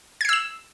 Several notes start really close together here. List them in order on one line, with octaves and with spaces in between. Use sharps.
G#6 C7 E6 E7